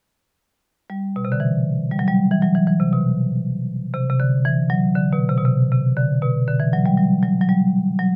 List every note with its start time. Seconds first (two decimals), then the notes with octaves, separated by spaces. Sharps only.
0.90 G3
1.16 B2
1.25 C3
1.32 D3
1.40 E3
1.91 G3
1.99 F#3
2.08 G3
2.31 E3
2.42 F#3
2.55 E3
2.67 E3
2.80 C3
2.92 B2
3.94 C3
4.10 C3
4.20 D3
4.45 E3
4.70 F#3
4.95 D3
5.12 B2
5.29 C3
5.37 B2
5.45 C3
5.72 C3
5.97 D3
6.22 B2
6.48 D3
6.60 E3
6.73 F#3
6.86 G3
6.97 F#3
7.23 F#3
7.41 F#3
7.49 G3
7.99 F#3